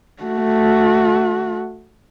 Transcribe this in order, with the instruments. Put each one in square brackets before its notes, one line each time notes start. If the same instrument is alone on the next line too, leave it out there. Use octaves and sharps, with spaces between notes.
[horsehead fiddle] A3 F#4